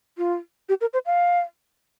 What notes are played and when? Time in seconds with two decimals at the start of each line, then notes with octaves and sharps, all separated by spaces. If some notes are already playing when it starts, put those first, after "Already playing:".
0.18 F4
0.69 G4
0.81 A#4
0.93 C5
1.06 F5